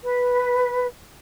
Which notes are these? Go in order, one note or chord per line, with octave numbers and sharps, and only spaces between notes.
B4